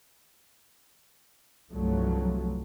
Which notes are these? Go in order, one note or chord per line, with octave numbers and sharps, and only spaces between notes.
C2 G2 F3 F#3 A3